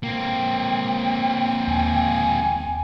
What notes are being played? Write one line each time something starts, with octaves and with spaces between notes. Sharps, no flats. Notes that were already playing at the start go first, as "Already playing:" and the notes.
A#3 C4 G5
D#2 G#5